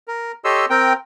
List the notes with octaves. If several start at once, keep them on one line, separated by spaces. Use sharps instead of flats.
A#4
G4 A4 C#5 D#5 C6 E6
C4 A#4 G5